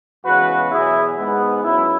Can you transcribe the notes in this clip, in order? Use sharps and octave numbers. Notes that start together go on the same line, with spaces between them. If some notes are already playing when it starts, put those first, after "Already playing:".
E2 C#3 G#3 B3 F#4 B4
E2 B2 F#3 E4 G#4
G#2 G#3 B3
F#2 F#3 B3 E4